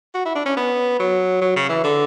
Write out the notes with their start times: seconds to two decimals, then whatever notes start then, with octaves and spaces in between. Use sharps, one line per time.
0.14 F#4
0.25 E4
0.35 D4
0.46 C#4
0.57 B3
0.99 F#3
1.41 F#3
1.56 C#3
1.69 E3
1.84 D3